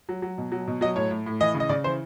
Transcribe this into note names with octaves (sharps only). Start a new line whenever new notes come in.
F#3
F#3
B2
F#3
B2
F#3 D#5
A2 C#5
A2
A2
E3 D#5
C#3
D#5
C#3 D5
E3 C5